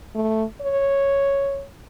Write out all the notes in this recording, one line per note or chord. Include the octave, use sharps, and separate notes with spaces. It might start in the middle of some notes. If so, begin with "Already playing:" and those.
A3
C#5